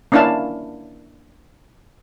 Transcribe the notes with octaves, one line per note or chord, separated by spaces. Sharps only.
A#3 C#4 D4 E4 F5 A5